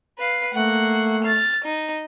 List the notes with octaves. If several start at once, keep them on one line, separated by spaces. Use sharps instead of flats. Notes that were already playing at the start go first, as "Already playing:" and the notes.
B4 F5
A3 A#3 F#5
F6 A6
D#4